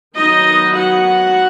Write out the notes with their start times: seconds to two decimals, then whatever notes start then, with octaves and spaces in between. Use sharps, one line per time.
0.16 D#3 F#3 B3 D#4 D#5
0.75 F#4 F#5